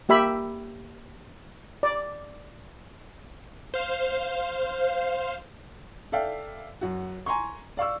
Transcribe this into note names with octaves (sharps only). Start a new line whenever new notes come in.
A#3 G4 E5 B5
D5
C5 F5
A4 D5 E5 F5 G5
F#2 F#4
G#5 A#5 C6 C#6
D5 F5 C#6 E6